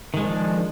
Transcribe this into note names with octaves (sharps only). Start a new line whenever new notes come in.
D#3 F3 G#3 D4